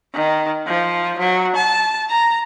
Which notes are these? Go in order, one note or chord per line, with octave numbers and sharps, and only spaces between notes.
D#3
F3
F#3
A5
A#5